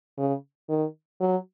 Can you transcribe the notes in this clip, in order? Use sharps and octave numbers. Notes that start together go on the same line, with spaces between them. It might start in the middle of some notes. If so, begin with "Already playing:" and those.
C#3
D#3
F#3